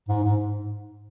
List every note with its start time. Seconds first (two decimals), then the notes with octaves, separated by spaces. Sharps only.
0.09 G#2
0.23 G#2